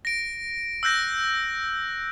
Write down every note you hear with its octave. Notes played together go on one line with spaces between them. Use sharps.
A#6 D7
E6 F#6 G6 A#6